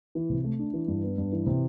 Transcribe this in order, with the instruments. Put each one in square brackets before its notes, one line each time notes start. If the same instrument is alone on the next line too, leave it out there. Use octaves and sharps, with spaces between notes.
[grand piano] E3
C3
A3
D4
E3
G2
B3
G2
E3
C3